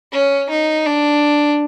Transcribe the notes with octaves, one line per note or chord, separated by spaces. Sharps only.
C#4
D#4
D4